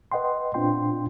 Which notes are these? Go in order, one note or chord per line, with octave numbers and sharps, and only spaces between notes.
B4 D#5 F#5 G5 C6
A#2 C4 D4 F4 G5 C6